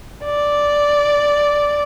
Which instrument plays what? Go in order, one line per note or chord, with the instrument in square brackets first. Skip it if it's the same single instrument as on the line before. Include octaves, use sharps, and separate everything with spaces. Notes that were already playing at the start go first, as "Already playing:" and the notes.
[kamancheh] D5